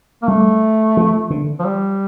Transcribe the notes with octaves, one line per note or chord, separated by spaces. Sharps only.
A#3
G3 A3
F3
D3
F3
G3